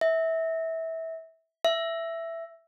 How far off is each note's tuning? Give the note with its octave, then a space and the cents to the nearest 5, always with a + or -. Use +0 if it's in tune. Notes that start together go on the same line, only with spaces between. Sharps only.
E5 -20
E5 +10